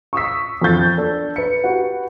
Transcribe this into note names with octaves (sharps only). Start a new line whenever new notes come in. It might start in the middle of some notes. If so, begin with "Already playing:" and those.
C#6 D#6 E6 B6
F2 F4 A4 C#6 G6 A6
D4 A4
B4 C#7
F#4 G4 B4 F#5